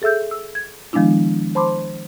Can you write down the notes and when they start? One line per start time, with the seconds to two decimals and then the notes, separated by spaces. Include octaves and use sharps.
0.02 G#4 A4 E5 E6 G6
0.31 E6
0.55 G#6
0.93 D#3 F3 G#3 B3 D4 E4
1.55 C5 A5 B5 C6 D6